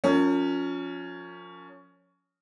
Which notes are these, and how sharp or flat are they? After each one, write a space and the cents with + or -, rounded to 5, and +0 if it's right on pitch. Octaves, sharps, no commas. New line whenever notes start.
F3 +25 C#4 +15 A#4 -30